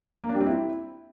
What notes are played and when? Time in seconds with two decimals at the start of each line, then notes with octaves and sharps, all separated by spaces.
0.24 A#3
0.29 D4
0.35 G3
0.40 C4
0.46 E4